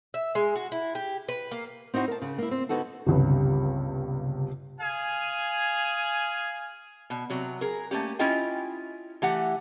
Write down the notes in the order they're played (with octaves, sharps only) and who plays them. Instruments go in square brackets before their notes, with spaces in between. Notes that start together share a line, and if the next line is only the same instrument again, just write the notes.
[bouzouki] E5
G#3
F#4
E4
G4
B4
A#3
[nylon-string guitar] C4 D#4 E4 F#4 C5
A#4 A5
C#3
A#3 E4
C4
D3 B3 D#4 F#4 A4
[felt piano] G1 C#2 G2 C3
[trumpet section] G#4 F5 G#5
[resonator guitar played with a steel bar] B2
C3 F#3
G#4 A#4
A3 A#3 C#4 G4
C#4 E4 F4 D#5 G5 G#5
E3 A3 G4 F#5